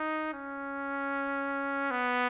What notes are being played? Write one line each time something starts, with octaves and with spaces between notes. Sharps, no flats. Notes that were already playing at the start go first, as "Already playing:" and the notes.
Already playing: D#4
C#4
B3